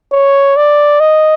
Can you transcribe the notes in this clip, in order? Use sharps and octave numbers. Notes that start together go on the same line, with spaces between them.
C#5
D5
D#5